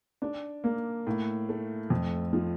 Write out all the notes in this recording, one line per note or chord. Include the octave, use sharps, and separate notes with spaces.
D4
A#3
A2
A3
F2
F3